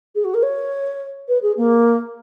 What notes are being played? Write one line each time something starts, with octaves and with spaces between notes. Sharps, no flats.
G#4
F#4
A#4
C#5
B4
G#4
A#3